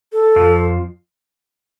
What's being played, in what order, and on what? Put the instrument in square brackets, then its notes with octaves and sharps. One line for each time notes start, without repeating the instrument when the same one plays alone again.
[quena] A4
[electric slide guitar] F2 F3